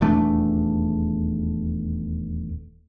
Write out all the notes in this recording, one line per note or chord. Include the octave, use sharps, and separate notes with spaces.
D#1 E2 A3 D4